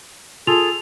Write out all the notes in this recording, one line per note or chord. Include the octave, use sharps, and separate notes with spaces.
F4 G#4 A4 F7